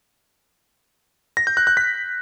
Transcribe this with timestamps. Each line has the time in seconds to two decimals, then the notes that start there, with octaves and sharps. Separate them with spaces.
1.37 A#6
1.47 G6
1.57 F#6
1.67 F#6
1.77 B6